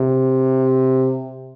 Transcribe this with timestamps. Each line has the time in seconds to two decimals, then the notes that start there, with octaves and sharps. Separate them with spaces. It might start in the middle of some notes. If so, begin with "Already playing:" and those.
Already playing: C3